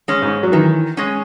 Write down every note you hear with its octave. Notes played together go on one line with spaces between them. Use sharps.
G#3 C#4
G#2
F#3
D#3 E3
G#3 C#4